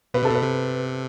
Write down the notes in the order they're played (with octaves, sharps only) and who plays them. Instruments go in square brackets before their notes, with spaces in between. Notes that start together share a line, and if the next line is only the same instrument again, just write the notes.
[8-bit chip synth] B2 [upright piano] B4
[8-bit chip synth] C3 [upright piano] A4
[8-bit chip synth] B2 [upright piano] B4
[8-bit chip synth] C3